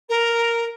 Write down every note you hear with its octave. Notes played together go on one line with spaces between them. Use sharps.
A#4